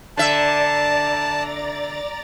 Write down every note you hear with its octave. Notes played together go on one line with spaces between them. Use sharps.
D3 D5 E5 A5 A#5 A6